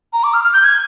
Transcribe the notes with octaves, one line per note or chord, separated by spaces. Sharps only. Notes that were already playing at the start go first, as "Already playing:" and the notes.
A#5
D6
F6
F6
G6
G#6